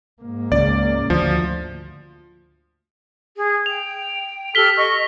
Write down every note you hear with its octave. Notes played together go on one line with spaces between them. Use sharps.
G#2 A#3
C#2 C#3 D5
D2 F3
G#4
G5 F7
G4 A4 F6 B6 G7
D#5 C#6